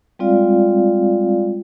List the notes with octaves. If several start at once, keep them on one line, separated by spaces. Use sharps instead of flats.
G3 G#3 C4 F4 D5 F5